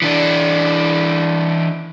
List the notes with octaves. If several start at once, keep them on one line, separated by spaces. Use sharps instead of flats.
E3 D4